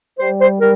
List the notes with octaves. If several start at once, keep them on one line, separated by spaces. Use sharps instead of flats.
G3 C5
C5
G3 A#4